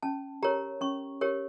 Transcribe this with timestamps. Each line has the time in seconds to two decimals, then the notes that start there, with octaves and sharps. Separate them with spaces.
0.03 C#4 A5
0.43 G4 A#4 C#5 A#5
0.81 C#4 C#6
1.21 G4 A#4 C#5